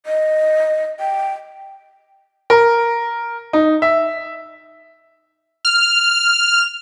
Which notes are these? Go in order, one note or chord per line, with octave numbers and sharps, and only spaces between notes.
D#5
G5
A#4
D#4
E5
F6